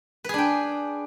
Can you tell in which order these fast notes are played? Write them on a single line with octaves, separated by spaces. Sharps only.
B4 G#4 D4 G5